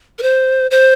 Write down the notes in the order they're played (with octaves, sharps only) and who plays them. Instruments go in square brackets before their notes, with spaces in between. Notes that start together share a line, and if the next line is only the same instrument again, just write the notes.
[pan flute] A#4
C5
C5